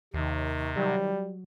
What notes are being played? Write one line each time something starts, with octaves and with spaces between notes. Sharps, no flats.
D#2 C3 D#3
F#3 G3